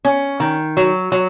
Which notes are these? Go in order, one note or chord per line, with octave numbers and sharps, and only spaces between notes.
C#4
D#3
F#3
F#3